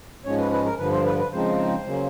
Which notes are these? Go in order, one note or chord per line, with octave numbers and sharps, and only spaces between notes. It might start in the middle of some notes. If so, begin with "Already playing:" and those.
G#2 F3 G#3 C#4 C#5
B4
B4
A#4
G2 D3 F3 B4
C5
B4
B4
C#3 F3 G#3 C4 D#4 C5
C#3 F#3 A#3 C#4